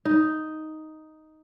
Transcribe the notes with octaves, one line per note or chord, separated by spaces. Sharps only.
D#4